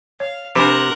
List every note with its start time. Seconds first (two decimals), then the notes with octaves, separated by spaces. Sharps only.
0.20 C#5 F5
0.55 C3 F3 D4 A#4 C5 F#5